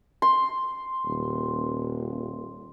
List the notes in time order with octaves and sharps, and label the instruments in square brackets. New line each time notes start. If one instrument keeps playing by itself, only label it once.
[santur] C6
[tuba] D#1